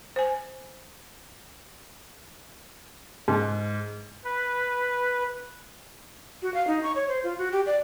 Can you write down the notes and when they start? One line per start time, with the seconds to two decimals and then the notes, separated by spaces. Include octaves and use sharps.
0.16 C5 G#5
3.28 G#2
4.24 B4
6.42 F#4
6.54 F5
6.67 D#4
6.83 C#6
6.96 C#5
7.08 C5
7.24 F4
7.38 F#4
7.52 G4
7.66 D5